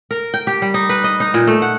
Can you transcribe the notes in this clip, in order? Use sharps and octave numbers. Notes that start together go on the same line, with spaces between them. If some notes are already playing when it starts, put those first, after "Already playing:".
A#4
G5
G4
G3
D#4
B4
D#5
D#4
A#2
A3
F#5